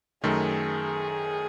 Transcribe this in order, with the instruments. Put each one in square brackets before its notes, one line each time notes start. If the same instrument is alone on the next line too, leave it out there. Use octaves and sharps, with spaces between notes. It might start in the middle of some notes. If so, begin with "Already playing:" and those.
[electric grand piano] F#2 D#3 A3 [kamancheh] G#4